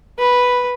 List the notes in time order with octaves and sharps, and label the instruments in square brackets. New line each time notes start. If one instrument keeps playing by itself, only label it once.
[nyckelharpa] B4